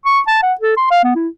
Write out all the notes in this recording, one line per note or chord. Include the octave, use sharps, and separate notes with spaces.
C#6
A5
F#5
A4
C6
F5
B3
E4